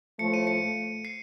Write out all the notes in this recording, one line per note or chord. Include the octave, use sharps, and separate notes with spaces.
A2 F3 A3 C#7
D#7
C#7
C7